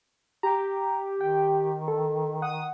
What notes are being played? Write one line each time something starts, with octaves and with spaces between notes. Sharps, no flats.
G4 A#5
D#3 G5
A4
F#5 D#6